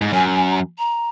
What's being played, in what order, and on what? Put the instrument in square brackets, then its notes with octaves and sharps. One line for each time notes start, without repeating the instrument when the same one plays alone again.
[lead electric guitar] G#2
[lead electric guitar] F#2 [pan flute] G#5
[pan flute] G#5
A#5
A#5